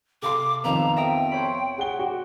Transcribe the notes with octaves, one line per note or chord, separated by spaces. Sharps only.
C3 A4 F5 C6 D6
F2 D#3 B3 B4 F5 A#5 E6
E5 G5 A#5 D#6
C5 C#5 B5
G#4 F#5 G7
F#4 G4